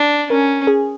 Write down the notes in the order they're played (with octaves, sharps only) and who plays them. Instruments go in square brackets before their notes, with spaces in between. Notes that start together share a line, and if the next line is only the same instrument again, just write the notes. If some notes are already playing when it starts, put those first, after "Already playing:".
Already playing: [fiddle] D4
[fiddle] C#4 [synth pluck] A#4
[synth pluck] G#4